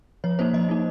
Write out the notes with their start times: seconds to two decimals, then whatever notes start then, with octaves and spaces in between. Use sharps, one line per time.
0.24 F3 C#5
0.39 A#3 D#4 C5
0.53 F3 D#5
0.69 A#3 D#4